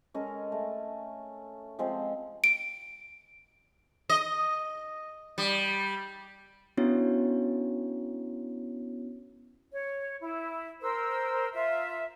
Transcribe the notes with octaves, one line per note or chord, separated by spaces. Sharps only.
G#3 C#4 A4 A#4
A3
F3 G#3 C4
D7
D#5
G3
B3 C#4 D4 E4 F#4 C#5
C#5
E4
A#4 C5 E6
F4 E5